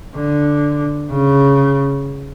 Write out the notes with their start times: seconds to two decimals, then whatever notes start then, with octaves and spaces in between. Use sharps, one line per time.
0.15 D3
1.11 C#3